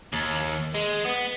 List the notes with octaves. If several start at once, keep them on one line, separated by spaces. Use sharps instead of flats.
D#2
G#3
B3